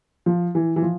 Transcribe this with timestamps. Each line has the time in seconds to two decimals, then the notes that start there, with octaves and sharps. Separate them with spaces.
0.26 F3
0.55 E3
0.76 E3
0.82 F3